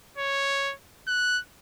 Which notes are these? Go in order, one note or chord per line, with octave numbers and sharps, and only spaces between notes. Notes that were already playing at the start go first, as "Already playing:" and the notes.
C#5
F#6